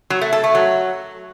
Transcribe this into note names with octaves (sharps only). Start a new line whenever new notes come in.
F#3
A3
A4
A3
F#3